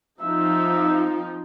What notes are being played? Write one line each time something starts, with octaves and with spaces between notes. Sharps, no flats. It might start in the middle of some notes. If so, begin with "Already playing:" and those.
F3 C4 D#4 E5